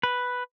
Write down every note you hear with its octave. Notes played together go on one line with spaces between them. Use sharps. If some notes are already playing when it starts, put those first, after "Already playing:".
B4